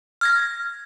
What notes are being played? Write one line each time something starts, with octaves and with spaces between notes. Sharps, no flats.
F6 G#6 A#6